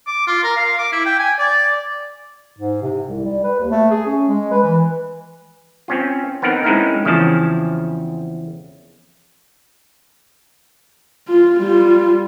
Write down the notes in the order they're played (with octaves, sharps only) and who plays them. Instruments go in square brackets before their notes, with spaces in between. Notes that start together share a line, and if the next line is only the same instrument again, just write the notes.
[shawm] D6
F4
A#4
F5
D6
E4
G5
G#5
D5
[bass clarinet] G#2
C3
C2
G3
B4
D#2
A3
G#4
C#4
G#3
B4
E3
[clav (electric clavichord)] C4 C#4 F4
B3 C4 D#4 A#4 F#5
G#3 C4 C#4 D#4 E4 A#4
E2 C#3 F3 C4 C#4 A5
[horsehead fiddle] F4
G3 F4